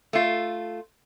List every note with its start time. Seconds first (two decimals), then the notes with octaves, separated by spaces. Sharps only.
0.13 A3 F4